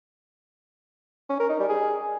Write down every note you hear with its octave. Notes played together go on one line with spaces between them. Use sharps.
C#4
A#4
D#4
G3
G#4